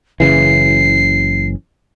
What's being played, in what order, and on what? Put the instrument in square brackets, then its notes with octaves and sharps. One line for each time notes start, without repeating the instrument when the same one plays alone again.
[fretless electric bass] F#1 C#3 E3 [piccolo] C7